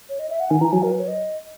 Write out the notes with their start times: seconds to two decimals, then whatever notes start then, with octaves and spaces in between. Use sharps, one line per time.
0.09 C#5
0.19 D#5
0.30 E5
0.40 F#5
0.50 D#3 G#5
0.61 E3 A#5
0.72 F#3 G#5
0.82 F#3 A#4
0.91 B4
1.00 C#5
1.08 D#5